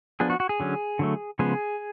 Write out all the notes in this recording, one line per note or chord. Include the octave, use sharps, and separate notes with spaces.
F3 B3 D4 G#4
F#4
F#4
G#4
D3 F#3 C#4
D3 F#3 A3
C#3 F3 G#3 B3 G#4